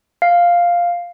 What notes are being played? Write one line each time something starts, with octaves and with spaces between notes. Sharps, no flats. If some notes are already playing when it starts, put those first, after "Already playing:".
F5